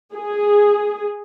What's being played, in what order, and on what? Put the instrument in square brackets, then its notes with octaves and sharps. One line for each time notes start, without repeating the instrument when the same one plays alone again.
[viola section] G#4